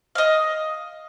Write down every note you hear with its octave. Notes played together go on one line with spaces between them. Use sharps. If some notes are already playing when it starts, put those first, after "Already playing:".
D#5 F5